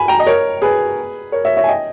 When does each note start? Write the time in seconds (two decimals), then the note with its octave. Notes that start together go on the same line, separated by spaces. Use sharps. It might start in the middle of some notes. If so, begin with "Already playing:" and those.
Already playing: G#5 B5
0.08 G5 A#5
0.20 D#5
0.27 A#4 C#5
0.62 G#4 B4
1.32 A#4 C#5
1.45 C#5 E5
1.57 C#5 E5
1.64 G#5
1.68 D#5 G5